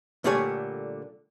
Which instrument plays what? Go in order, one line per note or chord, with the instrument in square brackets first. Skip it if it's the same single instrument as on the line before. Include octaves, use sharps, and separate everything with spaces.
[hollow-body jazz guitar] A#2 D3 G3 A3 C#5 G#5